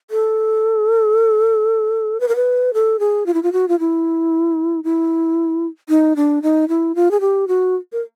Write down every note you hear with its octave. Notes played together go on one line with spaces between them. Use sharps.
A4
B4
A#4
B4
A4
G#4
F4
E4
F4
F#4
F4
E4
E4
D#4
D4
D#4
E4
F4
G#4
G4
F#4
A#4